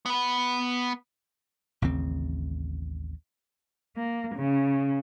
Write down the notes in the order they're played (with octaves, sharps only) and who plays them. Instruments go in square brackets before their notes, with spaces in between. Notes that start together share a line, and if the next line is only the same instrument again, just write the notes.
[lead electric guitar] B3 B4
[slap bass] A1 D#2 C#3 C4
[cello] A#3
C#3